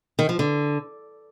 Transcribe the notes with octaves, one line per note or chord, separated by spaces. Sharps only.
D#3
F3
D3